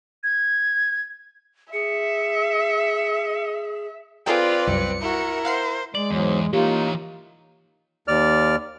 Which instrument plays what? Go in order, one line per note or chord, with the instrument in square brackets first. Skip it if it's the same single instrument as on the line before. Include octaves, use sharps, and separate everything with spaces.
[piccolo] G#6
[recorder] G#4 [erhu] E5 [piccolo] C#7
[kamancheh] C4 B4 [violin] F4 [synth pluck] G#4 A4 G5 [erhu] D5
[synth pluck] C2 F#2 [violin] C#7
[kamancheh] E4 A#4 [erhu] F#4
[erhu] C5 [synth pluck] F5 F#5 C7
[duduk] G#3 [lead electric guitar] D5 [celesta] F#7
[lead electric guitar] E2 [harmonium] G#2 F#3
[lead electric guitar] E3 C#5 [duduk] A#3 [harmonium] D#4 F4 [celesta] G4
[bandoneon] D#2 D5 F6